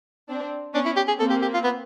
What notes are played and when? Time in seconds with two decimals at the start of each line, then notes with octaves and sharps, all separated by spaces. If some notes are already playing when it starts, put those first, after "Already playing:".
0.29 C4 D4
0.74 B3 C#4 D4
0.85 E4
0.96 G4
1.07 G#4
1.19 A#3 C4 A4
1.30 G4
1.42 G4
1.54 F4
1.64 B3